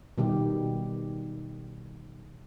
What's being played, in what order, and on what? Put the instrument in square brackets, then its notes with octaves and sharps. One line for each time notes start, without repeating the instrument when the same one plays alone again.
[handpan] B2 D#3 G3 G4